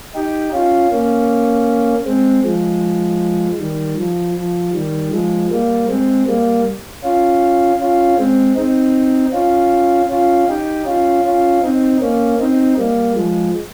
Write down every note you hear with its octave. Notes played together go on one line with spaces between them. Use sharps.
D#4 G4
C#4 F4
A#3 C#4
G#3 C4
F3 G#3
D#3 G3
F3
F3
D#3 G3
F3 G#3
G3 A#3
G#3 C4
G3 A#3
C#4 F4
C#4 F4
G#3 C4
C4 D#4
C#4 F4
C#4 F4
D#4 G4
C#4 F4
C#4 F4
C4 D#4
A#3 C#4
C4 D#4
G3 A#3
F3 G#3